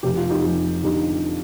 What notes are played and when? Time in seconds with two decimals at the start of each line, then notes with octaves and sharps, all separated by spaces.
0.03 F1 G4
0.17 F4
0.30 D#4 G4
0.44 F2
0.83 D3 D#4 G4